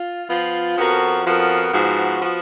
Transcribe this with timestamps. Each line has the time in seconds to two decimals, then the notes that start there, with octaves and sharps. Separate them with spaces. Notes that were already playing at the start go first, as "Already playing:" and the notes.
Already playing: F4
0.28 F3 B3 F4
0.77 F2 F3 B3 F#4 A#4
1.25 F2 F3 B3 F#4 A#4
1.73 G#2 F3 B3 F#4
2.22 F3 B3 F#4